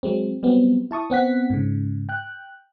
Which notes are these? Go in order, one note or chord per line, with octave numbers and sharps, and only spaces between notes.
F#3 G#3 C4
F#3 G3 B3 C4
E4 A5 C#6 D#6
B3 C4 F#5 B6
G#2 C#3
G5 F#6